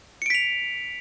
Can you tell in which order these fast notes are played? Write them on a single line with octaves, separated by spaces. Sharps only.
C#7 D7 B6 F7